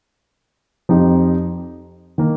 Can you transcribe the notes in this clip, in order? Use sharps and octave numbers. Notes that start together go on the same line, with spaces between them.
F2 F3 D#4 G4
D#3 A#3